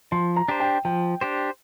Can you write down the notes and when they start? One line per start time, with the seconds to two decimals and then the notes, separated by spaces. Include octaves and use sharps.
0.12 F3 C6
0.36 A#5
0.48 D4 G4 C5
0.60 G5
0.85 F3 G5
1.21 D4 G4 C5